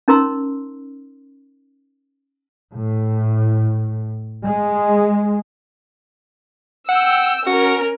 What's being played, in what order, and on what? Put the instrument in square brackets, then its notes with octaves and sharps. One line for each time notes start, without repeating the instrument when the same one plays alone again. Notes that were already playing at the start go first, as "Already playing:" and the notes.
[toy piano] C#4 D#4 A#4 A#5 C6 E6
[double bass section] A2
G#3
[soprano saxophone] F#5 [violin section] G5 E6
[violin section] C#4 A#4 [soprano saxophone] F#4